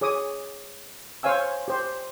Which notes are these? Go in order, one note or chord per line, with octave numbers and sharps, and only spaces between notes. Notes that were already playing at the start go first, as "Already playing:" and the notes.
G#4 C#5 D6 D#6
C5 C#5 F5 G#5 E6
G4 C5